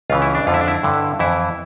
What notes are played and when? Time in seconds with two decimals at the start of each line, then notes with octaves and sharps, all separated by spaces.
0.10 C#2 C#3 E3 F4
0.22 E4
0.35 D4
0.47 F2 D3 F4
0.54 E4
0.61 D4
0.68 E4
0.83 G2 D3
1.19 F2 E3 E4